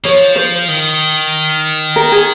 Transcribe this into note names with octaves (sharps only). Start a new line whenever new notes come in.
F3 C#5
C5
D#3
A#4
G#4